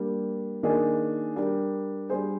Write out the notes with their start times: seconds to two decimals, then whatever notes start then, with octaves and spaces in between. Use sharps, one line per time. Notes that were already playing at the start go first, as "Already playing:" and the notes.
Already playing: G3 A#3 D4
0.63 D#3 A#3 D4 G#4
1.36 G3 D4 G4 A#4
2.10 G3 D4 G#4 C5